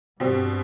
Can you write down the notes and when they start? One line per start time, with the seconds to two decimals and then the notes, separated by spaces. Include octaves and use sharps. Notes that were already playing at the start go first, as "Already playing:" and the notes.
0.20 G2 B2 G3 C4